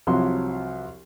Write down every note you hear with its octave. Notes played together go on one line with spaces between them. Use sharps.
C2 F3 F#3 C6